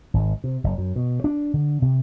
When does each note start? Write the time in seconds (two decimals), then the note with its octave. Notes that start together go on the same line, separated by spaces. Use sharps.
0.14 G#1
0.44 C3
0.64 F#1
0.78 F#2
0.96 B2
1.24 D4
1.54 D3
1.82 C3